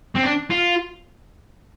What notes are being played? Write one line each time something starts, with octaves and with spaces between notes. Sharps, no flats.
C4
D4
F4